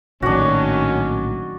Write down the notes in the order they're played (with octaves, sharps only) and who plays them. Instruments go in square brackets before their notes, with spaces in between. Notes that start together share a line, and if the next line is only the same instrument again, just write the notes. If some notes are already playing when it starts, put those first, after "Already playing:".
[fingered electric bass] A#1 A2 [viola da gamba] D#3 F#3 [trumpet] C#4 [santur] D4 F#4